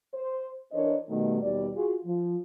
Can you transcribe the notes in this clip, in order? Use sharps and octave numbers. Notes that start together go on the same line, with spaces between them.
C5
E3 D4 A#4 C5 C#5 D#5
B2 D#3 G3 A3
D#2 B2 G3 D5
F4 F#4 G#4
F3